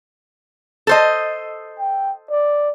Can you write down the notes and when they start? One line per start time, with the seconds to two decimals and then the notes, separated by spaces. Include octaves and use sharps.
0.87 A4 C5 D#5
1.79 G5
2.30 D5